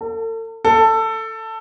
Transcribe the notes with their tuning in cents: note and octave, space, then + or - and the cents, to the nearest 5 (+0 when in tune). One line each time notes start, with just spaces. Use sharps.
A4 +40
A4 +15